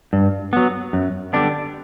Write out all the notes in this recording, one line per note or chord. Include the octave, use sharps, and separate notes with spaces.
G2
F#3 B3
F#2
D3 G3 B3 D4